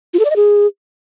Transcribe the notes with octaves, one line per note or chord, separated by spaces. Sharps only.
F4
A4
D5
D#5
G#4